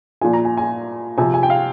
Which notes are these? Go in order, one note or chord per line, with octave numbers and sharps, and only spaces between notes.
A#2 F3 G#5
A#5
G#5
G#5
C3 F3 G#5
G#5
G5
F5